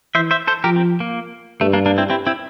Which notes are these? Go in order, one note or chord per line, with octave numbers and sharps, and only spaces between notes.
E3 C5 E5
C5 E5
A4 C5
F3 G4 A#4
C4
A#3
G2 A3
A#3 D4
A#3 D4
C4 E4
C4 E4
C4 E4